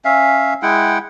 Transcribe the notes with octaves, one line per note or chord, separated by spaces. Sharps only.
C#4 E5 F5
G#3 E4 F#5 G5